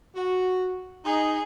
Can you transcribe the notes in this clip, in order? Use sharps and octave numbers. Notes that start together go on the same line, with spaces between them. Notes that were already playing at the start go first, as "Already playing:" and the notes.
F#4
D#4 G#4